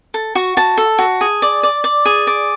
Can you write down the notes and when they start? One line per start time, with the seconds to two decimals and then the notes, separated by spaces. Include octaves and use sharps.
0.14 A4
0.35 F#4 C#6
0.57 F#4 A5
0.77 A4
0.99 F#4
1.21 G#4
1.42 D5
1.63 D5
1.84 D5
2.05 G#4
2.27 D5